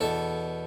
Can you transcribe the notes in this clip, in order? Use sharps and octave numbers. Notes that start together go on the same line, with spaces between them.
E2 B2 A4